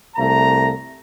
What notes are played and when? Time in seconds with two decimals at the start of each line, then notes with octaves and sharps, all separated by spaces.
0.16 C2 A3 A#5